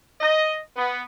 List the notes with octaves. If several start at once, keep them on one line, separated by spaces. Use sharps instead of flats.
D#5
B3